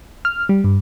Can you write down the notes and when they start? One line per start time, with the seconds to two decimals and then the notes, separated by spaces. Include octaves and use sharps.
0.25 F6
0.49 G3
0.64 G2